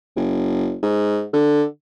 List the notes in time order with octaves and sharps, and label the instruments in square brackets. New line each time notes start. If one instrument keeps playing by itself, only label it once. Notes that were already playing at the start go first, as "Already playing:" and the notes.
[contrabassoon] F#1
G#2
D3